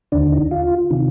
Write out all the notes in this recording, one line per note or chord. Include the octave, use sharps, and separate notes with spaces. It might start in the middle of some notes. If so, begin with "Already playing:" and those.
D#2 D3 D4
D#4
F4
C3 D#3